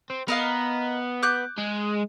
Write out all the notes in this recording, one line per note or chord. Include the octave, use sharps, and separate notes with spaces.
C4
B3 A#4 D#5 F5
D6 F#6 G6
G#3